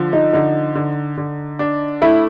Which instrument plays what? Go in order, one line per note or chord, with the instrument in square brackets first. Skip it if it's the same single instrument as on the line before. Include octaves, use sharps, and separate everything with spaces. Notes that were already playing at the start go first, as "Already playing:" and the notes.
Already playing: [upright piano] D3 F3
[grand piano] D#4
[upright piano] D3 [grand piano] D#4
[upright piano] D3
D3
D4
[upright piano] A3 [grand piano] E4